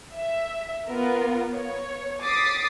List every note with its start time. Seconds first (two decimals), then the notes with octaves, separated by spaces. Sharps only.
0.15 E5
0.89 B3 F4 A#4
1.54 C#5
2.23 D6 D#6 A6 B6 C7